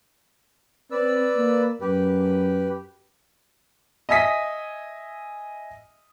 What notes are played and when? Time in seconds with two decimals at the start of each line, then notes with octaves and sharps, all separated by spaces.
0.91 C4 B4 D5 E6
1.36 A#3
1.81 F#2 G4 B4
4.09 D#5 E5 G#5 D#6 B6